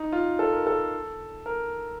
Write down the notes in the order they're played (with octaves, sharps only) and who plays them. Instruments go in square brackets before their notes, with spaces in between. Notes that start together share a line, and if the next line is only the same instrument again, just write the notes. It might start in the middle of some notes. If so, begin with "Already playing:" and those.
Already playing: [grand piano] D#4
F4
A4
A#4
A4
A#4